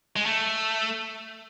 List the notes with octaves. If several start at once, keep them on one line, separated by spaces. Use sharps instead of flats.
G#3
A3